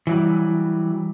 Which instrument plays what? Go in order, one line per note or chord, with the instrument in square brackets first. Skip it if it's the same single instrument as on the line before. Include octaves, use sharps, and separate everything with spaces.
[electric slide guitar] E3 F#3 G3